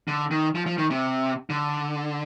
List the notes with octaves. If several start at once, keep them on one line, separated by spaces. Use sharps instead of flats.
D3
D#3
F3
F3
D#3
C3
D3